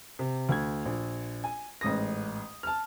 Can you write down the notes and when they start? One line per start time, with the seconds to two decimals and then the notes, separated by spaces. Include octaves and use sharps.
0.19 C3
0.49 D2 G#6
0.85 A#1
1.44 G#5
1.81 A1 G#2 D#6 A#6
2.63 A5 F6